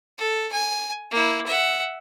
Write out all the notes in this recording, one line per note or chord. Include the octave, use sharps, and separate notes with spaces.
A4
G#5
A#3 E4
E5 F#5